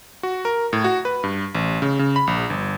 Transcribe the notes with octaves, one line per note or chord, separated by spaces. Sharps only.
F#4
A#4
A2
F#4
B4
G2
A1
C#3
C#3
B5
A#1
G1